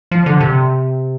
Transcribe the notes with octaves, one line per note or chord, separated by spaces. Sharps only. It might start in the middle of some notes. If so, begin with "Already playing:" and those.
F3
D3
C3